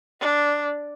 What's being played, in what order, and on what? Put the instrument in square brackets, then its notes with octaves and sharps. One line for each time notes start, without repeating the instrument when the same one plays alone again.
[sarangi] D4